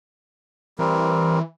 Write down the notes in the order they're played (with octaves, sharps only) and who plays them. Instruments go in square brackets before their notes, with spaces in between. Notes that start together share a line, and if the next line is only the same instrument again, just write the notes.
[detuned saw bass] E3 [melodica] G3 C4 A#4